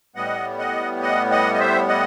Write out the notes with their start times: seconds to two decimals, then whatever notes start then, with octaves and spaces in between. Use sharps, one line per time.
0.15 A2 G3 B3 D#5 F#5
0.59 D#5 F#5
1.02 D#5 F#5
1.31 D#5 F#5
1.54 D#5
1.60 C5 E5
1.88 D#5 F#5